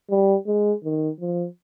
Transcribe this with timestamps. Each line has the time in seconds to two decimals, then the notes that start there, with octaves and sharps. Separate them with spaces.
0.10 G3
0.47 G#3
0.84 D#3
1.20 F3